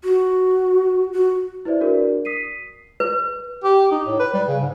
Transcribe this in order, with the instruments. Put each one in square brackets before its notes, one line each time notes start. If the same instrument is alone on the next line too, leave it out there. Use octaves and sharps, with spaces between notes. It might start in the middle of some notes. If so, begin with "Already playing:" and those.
[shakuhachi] F#4
F#4
[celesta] E4 B4 C5 D5 E5
D4 F#4 G#4 A#4 D5
D#6 B6 C7 D#7
[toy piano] B4
[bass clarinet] G4
D#4
A2
B4
G3
C#3
G#2